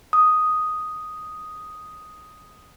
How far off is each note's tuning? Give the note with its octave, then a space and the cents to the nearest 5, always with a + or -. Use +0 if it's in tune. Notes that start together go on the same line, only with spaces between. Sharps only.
D#6 +0